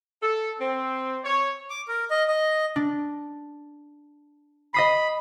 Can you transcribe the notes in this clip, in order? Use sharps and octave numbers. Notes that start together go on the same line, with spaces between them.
A4
C4
C#5
D6
A#4
D#5
D#5
D4
D#5 B5 D#6 C7